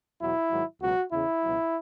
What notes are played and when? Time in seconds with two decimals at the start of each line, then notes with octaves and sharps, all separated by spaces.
0.21 E2 B2 F#3 E4
0.51 G#2 D#3 F#3
0.82 C#2 B2 F#3 F#4
1.12 E2 C#3 E3 E4
1.43 C#2 B2 F#3